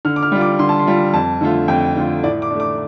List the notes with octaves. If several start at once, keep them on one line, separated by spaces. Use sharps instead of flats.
D3 F6
D6
F6
G3 F4
D6
D3 C6
A5
C6
G3 F4
F2 A5
D3 A3 F4
F2 G5
D3 A3 F4
A2 D5
D6
A3 D4
D6